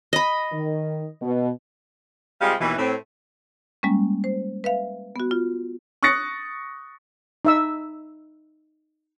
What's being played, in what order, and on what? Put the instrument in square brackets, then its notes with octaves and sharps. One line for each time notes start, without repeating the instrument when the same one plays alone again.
[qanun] D#5 B5
[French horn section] D#3
B2
[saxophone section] C3 G3 G#3 F4 F5
D#2 B2 D#3 E3
A2 C4
[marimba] G3 G#3 A#3 C#4
C5
B4 E5 F5
B3 F#4
F4
[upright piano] C#6 D#6 F#6 A6 A#6 C#7
[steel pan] D#4 E5 E6